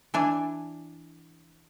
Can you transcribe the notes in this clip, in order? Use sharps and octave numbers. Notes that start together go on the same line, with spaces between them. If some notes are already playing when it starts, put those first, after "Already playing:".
E3 D4 G#5